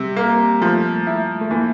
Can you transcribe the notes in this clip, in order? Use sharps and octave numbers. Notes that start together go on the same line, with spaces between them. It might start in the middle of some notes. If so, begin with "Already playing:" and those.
Already playing: C3 G3
A#3
F3 A3
E4
A3
E3 A#3